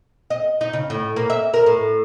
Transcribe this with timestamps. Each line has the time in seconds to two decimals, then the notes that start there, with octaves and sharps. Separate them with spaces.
0.30 D#5
0.61 D#4
0.73 C#3
0.90 A2
1.16 A#3
1.30 E5
1.54 A#4
1.66 A2